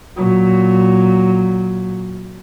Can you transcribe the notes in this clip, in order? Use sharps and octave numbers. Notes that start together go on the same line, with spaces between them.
A#2 F#3